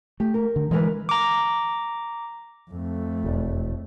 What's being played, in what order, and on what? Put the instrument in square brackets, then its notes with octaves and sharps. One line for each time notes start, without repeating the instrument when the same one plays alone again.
[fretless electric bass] A3 [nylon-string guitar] G4
[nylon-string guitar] A#4
[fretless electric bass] D3
[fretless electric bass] E3 [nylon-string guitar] G#3 A#4 B4
[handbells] A#5 D6
[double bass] F2 A3
[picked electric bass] E1